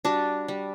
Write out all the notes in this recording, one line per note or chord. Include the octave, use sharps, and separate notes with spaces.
G3 D4 F#4
G3